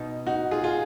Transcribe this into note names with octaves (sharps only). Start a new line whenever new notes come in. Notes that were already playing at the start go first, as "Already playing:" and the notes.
Already playing: B2 D#4
D#4 F#4
F4 G#4
F4 G#4